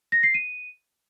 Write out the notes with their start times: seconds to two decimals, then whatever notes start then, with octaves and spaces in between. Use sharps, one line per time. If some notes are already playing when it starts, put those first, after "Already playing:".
0.12 A#6
0.23 C7
0.34 D#7